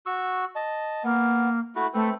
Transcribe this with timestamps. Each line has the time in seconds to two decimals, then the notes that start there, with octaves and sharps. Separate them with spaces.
0.06 F#4 C#6 E6
0.56 D#5 A5
1.03 A#3 B3
1.76 A3 E4 F#4
1.94 A3 C4 A4 B4